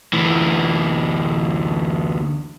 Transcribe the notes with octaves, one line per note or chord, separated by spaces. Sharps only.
D2 E3